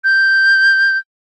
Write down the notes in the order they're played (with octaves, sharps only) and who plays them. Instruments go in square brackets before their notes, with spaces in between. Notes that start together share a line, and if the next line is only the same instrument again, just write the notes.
[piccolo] G6